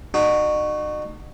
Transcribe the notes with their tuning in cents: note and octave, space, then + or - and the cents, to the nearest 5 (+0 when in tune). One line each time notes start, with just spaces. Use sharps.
D#4 -45 F#4 +0